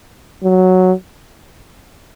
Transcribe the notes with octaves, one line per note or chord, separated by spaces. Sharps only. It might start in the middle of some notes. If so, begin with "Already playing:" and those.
F#3